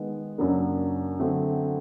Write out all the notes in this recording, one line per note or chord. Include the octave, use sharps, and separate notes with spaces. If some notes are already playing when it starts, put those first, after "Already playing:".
Already playing: D#3 G#3 B3
F#2 C#3 F#3 A#3 D4
D3 F#3 A3 C4